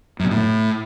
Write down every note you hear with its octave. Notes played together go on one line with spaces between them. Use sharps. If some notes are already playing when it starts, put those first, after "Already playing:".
F#2
B2
A2